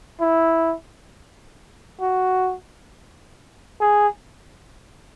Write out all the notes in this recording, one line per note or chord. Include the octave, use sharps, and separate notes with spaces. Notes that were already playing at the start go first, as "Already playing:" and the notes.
E4
F#4
G#4